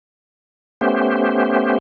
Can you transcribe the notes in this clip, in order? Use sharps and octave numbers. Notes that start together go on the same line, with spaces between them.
A3 B3 C#4 G4 C5